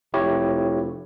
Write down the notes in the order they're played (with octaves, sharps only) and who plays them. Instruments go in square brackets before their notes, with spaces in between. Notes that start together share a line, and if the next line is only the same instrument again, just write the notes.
[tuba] F1 [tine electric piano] E4 G4 C#5